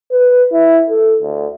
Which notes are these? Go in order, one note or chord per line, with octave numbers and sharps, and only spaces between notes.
B4
E4
A4
D2